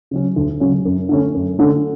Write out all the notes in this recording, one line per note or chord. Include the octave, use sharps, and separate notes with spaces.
C#3 F#3 C#4
D2
C#3 F#3 C#4
F#2
D3 A3 C#4
F#2
D3 A3 C#4